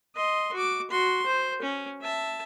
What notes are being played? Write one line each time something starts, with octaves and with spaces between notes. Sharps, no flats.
D#5 C6
F#4 D6
F#4 C6
C5
C#4
E5 A5